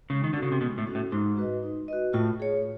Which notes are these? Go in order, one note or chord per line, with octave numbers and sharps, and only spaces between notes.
C#3 G#3
D#3
D3 C#4 F#4 A4
C#3
C3
B2 G#3
A2
C#4 F#4 A4
A2
G#2 D#4
F#4 B4 D#5
D#4
F#4 B4 D#5
A2 F4
G#4 C#5